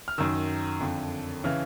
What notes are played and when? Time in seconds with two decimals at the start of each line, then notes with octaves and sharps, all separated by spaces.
0.08 F6
0.18 F#2 D#3 E6
0.80 F2 D3
1.44 C#3 E3 F6